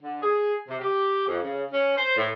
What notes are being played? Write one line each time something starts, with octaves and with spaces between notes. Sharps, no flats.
D3
G#4
C3
G4
F2
C#3
C#4
C5
A2